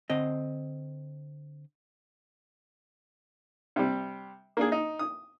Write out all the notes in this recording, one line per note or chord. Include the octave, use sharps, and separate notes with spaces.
D3 C4 D#5
C3 G3
A#3 D4 G#4
D#4
D#6